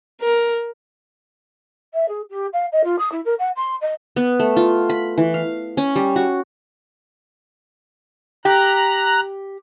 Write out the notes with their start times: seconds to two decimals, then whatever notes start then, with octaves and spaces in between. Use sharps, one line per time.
0.21 A#4
1.94 E5
2.08 G#4
2.30 G4
2.53 F5
2.72 D#5
2.84 F4
2.99 D#6
3.12 E4
3.25 A#4
3.39 F#5
3.56 C6
3.81 D#5
4.16 B3
4.40 A3
4.57 F4
4.90 B5
5.18 E3
5.34 F5
5.77 C#4
5.96 G3
6.16 F#4
8.45 G4 A#5 F#6